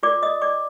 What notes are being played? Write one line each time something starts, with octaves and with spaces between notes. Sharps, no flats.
F4 A#4 D5 D6
D#5 D#6
D5 D6